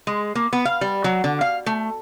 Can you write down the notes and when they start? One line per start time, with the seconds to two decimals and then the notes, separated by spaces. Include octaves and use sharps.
0.07 G#3
0.35 A#3
0.53 B3
0.65 F5
0.81 G3
1.04 F#3
1.24 D3
1.41 F5
1.66 A3